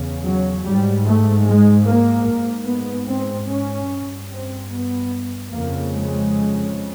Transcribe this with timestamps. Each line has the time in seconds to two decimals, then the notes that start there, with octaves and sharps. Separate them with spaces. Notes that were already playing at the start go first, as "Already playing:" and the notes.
Already playing: E2 C#3
0.23 F#3
0.63 G#2 G3
1.05 A3
1.45 G#3
1.85 A#3
2.26 G#2
2.66 B3
3.08 C4
3.48 C#4
3.88 G2
4.29 C4
4.70 B3
5.50 F2 C#3 A#3
5.91 G#3